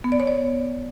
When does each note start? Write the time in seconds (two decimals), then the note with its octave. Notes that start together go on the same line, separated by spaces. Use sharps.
0.04 B3
0.12 D5
0.20 C#5
0.27 D5